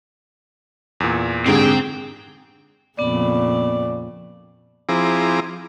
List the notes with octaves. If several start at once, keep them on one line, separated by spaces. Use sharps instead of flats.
E2 A#2
G#2 D3 C4 G4 G#4 G5
F2 A#2 C#3 B3 D5 B5
F3 C4 E4 G#4 A#5 D6